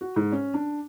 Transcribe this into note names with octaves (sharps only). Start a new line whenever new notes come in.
F#4
G#2
C#4
D4